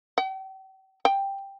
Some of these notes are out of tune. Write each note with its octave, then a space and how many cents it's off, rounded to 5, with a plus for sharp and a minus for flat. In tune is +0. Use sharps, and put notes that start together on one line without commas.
G5 -40
G5 +5